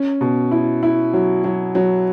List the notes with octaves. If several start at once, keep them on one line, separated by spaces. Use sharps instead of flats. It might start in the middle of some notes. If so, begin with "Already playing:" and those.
Already playing: C#4
B2
E4
E4
F#3
F#3
F#3